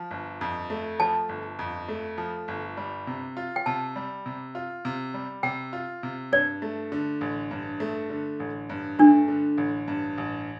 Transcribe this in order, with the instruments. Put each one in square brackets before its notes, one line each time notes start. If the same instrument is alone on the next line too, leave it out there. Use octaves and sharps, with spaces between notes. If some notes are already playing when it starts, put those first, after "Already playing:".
Already playing: [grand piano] F3
G1
F2
A3
[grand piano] F3 [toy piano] A5
[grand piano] G1
F2
A3
F3
G1
G3
C3
F4
[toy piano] G5
[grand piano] C3 [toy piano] A5
[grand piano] G3
C3
F4
C3
G3
[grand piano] C3 [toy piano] G5
[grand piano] F4
C3
[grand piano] G2 [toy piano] D5
[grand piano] A3
D3
A1
G2
A3
D3
A1
G2
[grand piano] A3 [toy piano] D4
[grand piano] D3
A1
G2
A1